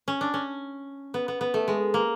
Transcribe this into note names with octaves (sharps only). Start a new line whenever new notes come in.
C#4
D4
C#4
B3
B3
B3
A3
G#3
A#3